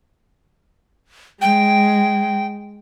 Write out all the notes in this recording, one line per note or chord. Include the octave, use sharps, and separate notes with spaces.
G#3 G5